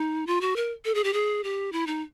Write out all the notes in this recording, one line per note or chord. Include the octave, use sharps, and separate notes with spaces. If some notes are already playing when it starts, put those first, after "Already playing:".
Already playing: D#4
F4
F#4
A#4
A4
G#4
G4
G#4
G4
E4
D#4